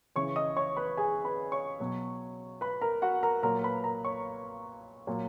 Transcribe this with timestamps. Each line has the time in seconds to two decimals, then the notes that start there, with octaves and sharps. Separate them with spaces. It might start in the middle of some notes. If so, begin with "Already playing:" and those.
0.16 C#3 E3 C#5 C#6
0.36 D#5 D#6
0.57 C#5 C#6
0.77 B4 B5
0.97 G#4 G#5
1.25 B4 B5
1.52 C#5 C#6
1.80 B2 F#3
2.61 B4 B5
2.81 A#4 A#5
3.02 F#4 F#5
3.23 A#4 A#5
3.43 A#2 F#3 A#4 A#5
3.63 B4 B5
3.84 A#4 A#5
4.05 C#5 C#6
5.07 A#2 F#3